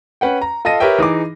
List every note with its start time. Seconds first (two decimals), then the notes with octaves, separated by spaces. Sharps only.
0.21 C#4 B4 F#5 G5
0.41 A#5
0.65 F4 A4 D#5 A#6 D#7
0.80 G4 A#4 B4 C#5 E5 G5
0.98 E3 D#4 G#4 D6